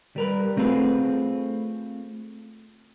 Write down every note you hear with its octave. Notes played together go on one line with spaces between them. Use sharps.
G3 A#4 B4
A3 C4 F4 G#4 B4